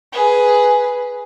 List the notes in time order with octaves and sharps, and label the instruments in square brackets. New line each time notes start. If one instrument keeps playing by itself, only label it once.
[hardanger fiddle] G#4 B4